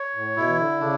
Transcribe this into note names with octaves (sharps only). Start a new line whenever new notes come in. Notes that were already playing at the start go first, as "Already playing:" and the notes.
Already playing: C#5
A2
B2 E4
E3
D3
C#3 D4